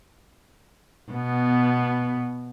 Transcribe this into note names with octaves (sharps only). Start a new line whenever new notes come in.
B2 B3